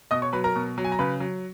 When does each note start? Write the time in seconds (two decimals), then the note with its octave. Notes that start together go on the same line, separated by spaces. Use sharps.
0.11 B2 D#5 D#6
0.22 C#5 C#6
0.33 F#3 B4 B5
0.44 A#4 A#5
0.56 B2
0.78 F#3
0.84 G#5
0.92 A#5
0.99 C#3 B4 B5
1.20 F#3